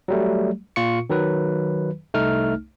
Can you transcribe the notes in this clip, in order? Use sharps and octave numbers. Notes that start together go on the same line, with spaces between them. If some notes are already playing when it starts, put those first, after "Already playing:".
F#3 G3 A3
A#2 F4 C#6 C#7
D#3 F#3 B4
C2 A3 D#4 F6